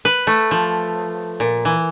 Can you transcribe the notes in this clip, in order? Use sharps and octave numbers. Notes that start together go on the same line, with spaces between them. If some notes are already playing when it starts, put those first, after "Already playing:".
B4
A3
F3
A#2
E3